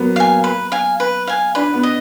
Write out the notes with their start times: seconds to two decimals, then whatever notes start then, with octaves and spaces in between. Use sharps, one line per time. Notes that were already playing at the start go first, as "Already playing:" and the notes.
Already playing: F#3 A#3 B3
0.16 F5 G#5
0.44 B4
0.72 F5 G#5
1.00 B4
1.27 F5 G#5
1.55 D4 B4
1.74 B3
1.83 D#5